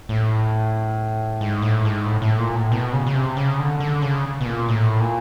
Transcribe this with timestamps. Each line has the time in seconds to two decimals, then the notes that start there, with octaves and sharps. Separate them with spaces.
0.09 A2
1.41 G#2
1.62 A2
1.85 G#2
2.06 A2
2.22 A2
2.38 A#2
2.55 A2
2.72 B2
2.93 C#3
3.07 C#3
3.15 C3
3.37 C#3
3.59 D3
3.80 D3
4.02 C#3
4.41 B2
4.46 A#2
4.68 A2
5.00 A#2